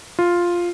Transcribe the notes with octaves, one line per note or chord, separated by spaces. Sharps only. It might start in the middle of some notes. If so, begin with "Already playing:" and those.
F4